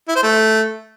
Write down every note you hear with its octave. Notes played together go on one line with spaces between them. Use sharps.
E4
C5
A3